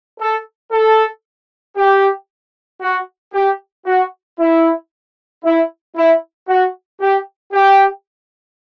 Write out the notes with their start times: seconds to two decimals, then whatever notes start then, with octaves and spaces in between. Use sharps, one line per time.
0.20 A4
0.72 A4
1.77 G4
2.82 F#4
3.34 G4
3.86 F#4
4.39 E4
5.44 E4
5.96 E4
6.48 F#4
7.01 G4
7.53 G4